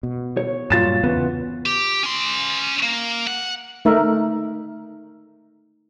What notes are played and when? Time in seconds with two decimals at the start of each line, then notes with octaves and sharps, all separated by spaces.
0.03 B2
0.37 C#5
0.70 G2 A#2 F#3 F4 A6 E7
1.04 E2 C#3 B3
1.66 G4
2.03 C#4 C6
2.83 A#3
3.27 F#5
3.85 A3 D#4 A#4 E5